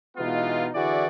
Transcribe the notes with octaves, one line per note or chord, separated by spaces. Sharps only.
B2 E3 G#3 B3 D#4 F4
D3 E3 E4 F#4 G#4 D5